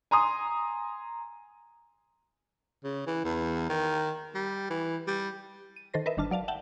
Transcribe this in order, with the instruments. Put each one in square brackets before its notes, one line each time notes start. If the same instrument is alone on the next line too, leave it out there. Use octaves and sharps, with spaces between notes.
[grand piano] G#5 A#5 C6 D#6
[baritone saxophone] C#3
E3
E2
D#3
G3
E3
G3
[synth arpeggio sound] D#7
D#3 A4 C5 A#6
A#4 B4 D#5 E5
G1 D#3 D4 A5 F6
F#3 D5 F5 A5
E5 F#5 G5 A5